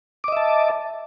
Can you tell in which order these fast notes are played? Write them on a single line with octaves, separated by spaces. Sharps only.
D6 D#5 E5 A5